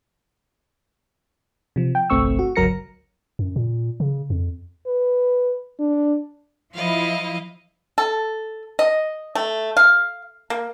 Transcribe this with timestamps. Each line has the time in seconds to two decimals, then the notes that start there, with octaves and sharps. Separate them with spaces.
1.76 C3 F3
1.95 G5
2.10 G1 C2 A3 C4 C#6 E6
2.39 F#4
2.56 G1 C#2 F#3 A#4 A#6 C#7
3.39 F#2
3.56 A#2
4.00 C#3
4.30 F2
4.87 B4
5.80 D4
6.73 F3 E4 D#5 F5
7.98 A4
8.79 D#5
9.35 A3
9.77 F5
10.50 A#3